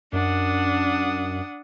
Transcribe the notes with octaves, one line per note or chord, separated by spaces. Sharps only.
F#2 D4 F#5 D#6